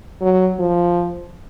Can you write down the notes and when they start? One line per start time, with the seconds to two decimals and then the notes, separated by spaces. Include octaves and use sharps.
0.21 F#3
0.59 F3